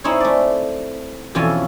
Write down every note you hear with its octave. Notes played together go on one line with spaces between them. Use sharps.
C4 D#4 E4 G#4 C#5
A3 D5
F2 B2 E3 C#4 F4 G#5